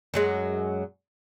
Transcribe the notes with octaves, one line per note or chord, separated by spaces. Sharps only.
F#2 F#3 G#3